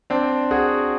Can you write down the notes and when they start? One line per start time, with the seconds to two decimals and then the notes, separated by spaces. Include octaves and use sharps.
0.10 C4 D4
0.51 F#4 G#4